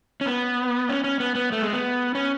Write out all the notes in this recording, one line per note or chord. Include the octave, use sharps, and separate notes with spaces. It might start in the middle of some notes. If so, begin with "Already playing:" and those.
C#4
B3
C#4
C#4
B3
B3
A3
G#3
B3
C#4